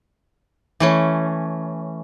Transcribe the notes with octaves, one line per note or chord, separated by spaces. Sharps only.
E3 A3 C#4